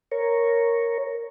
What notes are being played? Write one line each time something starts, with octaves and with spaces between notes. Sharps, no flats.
A#4 C#5